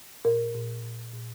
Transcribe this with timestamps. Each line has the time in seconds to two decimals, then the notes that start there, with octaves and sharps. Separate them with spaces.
0.25 A#2 A#4
0.55 A#2
0.83 A#2
1.13 A#2